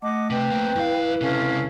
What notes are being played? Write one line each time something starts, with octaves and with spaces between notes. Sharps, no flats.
A3 D#5 F#5 D6
C3 B4 G5
A#3 C4
F#2 E4 F5
C#2 C3 C#4 A4 F5